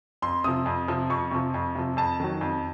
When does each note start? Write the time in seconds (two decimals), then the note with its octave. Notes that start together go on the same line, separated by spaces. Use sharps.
0.22 F2 C6
0.44 C3 F3 D#6
0.66 F2
0.88 C3 F3
1.10 F2 C#6
1.31 C3 F3
1.54 F2
1.75 C3 F3
1.97 F2 A5
2.20 D#3 F#3
2.41 F2